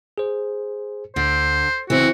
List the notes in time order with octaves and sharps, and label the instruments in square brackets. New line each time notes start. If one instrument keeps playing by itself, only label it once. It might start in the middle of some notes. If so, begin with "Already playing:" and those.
[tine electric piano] G#4 C5
[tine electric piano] D2 [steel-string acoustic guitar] D3 [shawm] C5
[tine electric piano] C#3 [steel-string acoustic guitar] E3 C4 [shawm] F#4